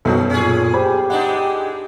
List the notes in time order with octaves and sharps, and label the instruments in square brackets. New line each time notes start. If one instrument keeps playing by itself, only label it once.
[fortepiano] B1 F#3 [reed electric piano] F#2 B3 A4 [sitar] D#4
[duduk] A#2 [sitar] C#4 G#4
[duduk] G4 [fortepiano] C5 B5
[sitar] G#3 D4 D#4 [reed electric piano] F#5